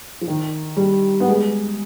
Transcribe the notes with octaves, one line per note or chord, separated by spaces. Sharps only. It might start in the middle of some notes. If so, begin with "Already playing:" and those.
F3
D#3
G3
B3
G#3